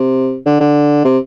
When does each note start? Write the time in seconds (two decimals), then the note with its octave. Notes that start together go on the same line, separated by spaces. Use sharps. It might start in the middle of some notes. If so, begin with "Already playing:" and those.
Already playing: C3
0.46 D3
0.60 D3
1.05 C3